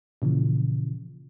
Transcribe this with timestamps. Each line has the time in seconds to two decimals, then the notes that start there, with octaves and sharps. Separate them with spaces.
0.22 A#2 C#3 E3 F3